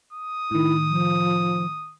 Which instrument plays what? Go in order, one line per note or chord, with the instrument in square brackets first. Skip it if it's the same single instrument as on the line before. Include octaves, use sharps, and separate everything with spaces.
[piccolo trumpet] D#6
[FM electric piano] A2 D#3 [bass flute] E4
[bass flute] F3